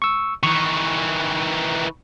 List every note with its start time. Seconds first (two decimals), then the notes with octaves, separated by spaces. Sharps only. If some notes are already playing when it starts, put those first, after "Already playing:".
0.02 C#6 E6
0.43 D#3 E3 C#6